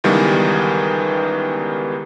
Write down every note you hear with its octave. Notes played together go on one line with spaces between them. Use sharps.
C#2 D#3 E3 G3 B3